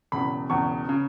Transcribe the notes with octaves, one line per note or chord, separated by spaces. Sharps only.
E1 E2 C#3 B5
E1 E2 C#3 C#6
C#3